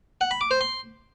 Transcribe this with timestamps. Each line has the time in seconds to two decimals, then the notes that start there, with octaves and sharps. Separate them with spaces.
0.21 F#5
0.31 B5
0.41 D6
0.51 C5
0.61 C6